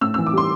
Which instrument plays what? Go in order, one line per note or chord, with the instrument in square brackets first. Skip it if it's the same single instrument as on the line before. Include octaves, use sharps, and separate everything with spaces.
[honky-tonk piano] A2 E6
E6
E3
D6
G3 C6